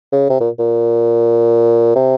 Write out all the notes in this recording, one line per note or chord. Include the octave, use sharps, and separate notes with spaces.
C#3
C3
A#2
A#2
C3